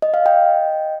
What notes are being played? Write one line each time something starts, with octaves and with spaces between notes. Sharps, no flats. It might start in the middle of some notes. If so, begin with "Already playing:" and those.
D#5
F5
D#5 G5